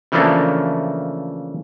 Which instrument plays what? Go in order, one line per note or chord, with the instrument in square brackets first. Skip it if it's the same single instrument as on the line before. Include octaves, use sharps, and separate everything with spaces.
[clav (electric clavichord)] C#3 E3 F3 A3 A#3 D4